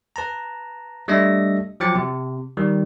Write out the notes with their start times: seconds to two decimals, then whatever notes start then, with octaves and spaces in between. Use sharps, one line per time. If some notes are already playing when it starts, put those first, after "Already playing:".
0.16 B4 A5 A#5
1.08 G3 A3 D4 D#5 E5 A#6
1.80 F3 F#3 G5 D6 A6 C#7
1.95 C3
2.57 D#3 G3